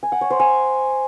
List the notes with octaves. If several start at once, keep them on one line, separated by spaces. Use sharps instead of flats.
G#5
F#5
C#5
C5
G#5